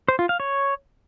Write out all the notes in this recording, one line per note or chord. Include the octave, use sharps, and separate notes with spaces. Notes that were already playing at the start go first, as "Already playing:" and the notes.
C5
F4
F5
C#5